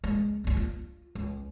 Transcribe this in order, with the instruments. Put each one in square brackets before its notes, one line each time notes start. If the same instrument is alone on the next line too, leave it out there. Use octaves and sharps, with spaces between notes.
[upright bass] C#2 G#3
C2 G2
F4
C#2